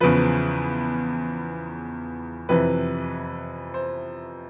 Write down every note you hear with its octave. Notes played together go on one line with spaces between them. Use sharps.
E2 C#3 F3 B4
F2 C3 E3 B4
C5